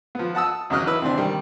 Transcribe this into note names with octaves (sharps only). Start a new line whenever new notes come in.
F3 B3
F#5 A5 D#6 E6
E2 C#3 F#3 D#5 F6 F#6
E4 B4 E6
C3 E3 C4 D4
D#3 G3